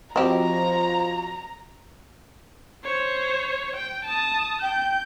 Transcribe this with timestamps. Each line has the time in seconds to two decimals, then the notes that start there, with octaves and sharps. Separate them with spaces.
0.16 F3 C4 F#4 G4 D#5 A#5
2.84 C5 C#5
3.76 G5
4.04 A5 D#6
4.62 G5 G6